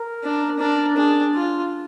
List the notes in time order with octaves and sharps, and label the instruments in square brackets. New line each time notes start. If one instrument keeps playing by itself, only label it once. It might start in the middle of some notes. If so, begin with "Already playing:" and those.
Already playing: [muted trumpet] A#4
[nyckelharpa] D4
[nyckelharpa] D4 [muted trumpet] A#4
[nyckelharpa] D4 [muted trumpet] G#4
[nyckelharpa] F4